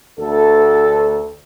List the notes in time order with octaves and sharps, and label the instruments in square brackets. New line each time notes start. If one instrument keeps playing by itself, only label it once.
[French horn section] D2 A4